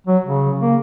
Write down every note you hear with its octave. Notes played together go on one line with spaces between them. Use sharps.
F#3
C#3
A#3